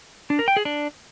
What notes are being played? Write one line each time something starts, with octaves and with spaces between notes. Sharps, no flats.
D4
A#4
G5
G#4
D4